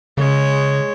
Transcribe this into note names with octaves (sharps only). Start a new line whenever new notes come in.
C#3 G#3 C#5